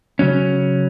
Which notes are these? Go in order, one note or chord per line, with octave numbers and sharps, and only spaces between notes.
C#3 F#3 C#4